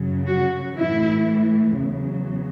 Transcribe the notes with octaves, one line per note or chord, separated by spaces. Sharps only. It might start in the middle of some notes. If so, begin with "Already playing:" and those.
Already playing: F#2 C#3 F#3
F#4
A2 E3 E4
E2 C#3 F#3